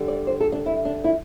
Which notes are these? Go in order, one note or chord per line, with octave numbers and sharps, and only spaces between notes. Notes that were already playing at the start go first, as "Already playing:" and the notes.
Already playing: D3 G3
D5
C5
A4
D4
E4
D4
E4